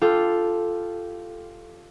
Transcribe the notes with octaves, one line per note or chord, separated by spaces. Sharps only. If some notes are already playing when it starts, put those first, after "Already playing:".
F4 G4 A4